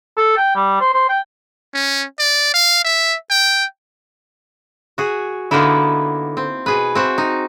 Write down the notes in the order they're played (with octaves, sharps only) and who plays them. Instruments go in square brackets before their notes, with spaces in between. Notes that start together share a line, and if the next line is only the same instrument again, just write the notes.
[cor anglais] A4
G5
G3
C5
C5
G5
[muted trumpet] C#4
D5
F5
E5
G5
[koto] F#4 G#4
D3 A#3 B3 D#4 E4
C4
B2 G#4 B4
C4 F#4 E5
D#4